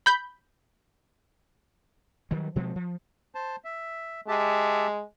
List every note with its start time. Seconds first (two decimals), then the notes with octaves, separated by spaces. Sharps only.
0.06 B5 G6
2.31 D#3 F#3 G3
2.56 B2 F3 G#3 C4
2.76 F3
3.35 C5 A5
3.65 E5
4.28 G#3 G4 E5 A5